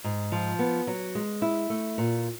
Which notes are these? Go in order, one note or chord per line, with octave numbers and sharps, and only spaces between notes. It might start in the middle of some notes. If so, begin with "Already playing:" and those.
G#2
F3
B3
F#3
G#3
E4
A3
A#2